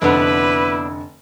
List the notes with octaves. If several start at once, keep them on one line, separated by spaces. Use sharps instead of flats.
F1 D3 B3 D4 E4 B4